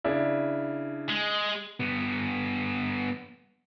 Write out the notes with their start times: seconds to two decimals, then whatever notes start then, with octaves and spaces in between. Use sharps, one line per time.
0.04 C#3 D4 E4
1.10 G#3
1.80 G2 B3